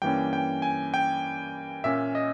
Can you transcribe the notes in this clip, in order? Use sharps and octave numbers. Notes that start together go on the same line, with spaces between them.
G2 E3 A#3 C#4 G5
G5
G#5
G5
A#2 A#3 C#4 E5
D#5